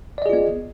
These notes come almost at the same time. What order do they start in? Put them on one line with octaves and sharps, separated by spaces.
D5 D#5 G#4 F4 B3